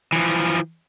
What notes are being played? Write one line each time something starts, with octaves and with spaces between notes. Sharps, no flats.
E3 F3